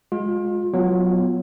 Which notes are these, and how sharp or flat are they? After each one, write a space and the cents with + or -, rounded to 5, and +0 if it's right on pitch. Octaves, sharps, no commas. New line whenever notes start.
G#3 +0 F4 +30
F#3 -10 B3 +10 F4 +0